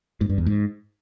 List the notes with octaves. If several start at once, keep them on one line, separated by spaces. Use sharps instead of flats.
G#2
G2
E2
G#2